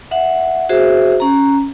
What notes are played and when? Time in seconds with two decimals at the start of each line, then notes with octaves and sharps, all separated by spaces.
0.11 E5 F#5
0.69 F#4 G#4 C5 E5
1.20 C#4 A#5